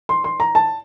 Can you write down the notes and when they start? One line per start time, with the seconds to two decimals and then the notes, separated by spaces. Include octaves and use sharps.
0.09 C6
0.24 C6
0.40 A#5
0.55 A5